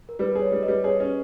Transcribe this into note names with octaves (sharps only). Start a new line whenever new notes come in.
A#4
G3 B4
G#4
C#5
G3
B4 D#5
G3
G#4 C#5
C#4